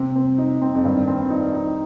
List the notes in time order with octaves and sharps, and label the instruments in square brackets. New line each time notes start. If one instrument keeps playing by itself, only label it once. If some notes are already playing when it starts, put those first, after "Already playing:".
Already playing: [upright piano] C3 [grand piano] C4
[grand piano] C4
D#4
C4
[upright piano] F2
[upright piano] G2 [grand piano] D#3
[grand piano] C4
D#4
D#4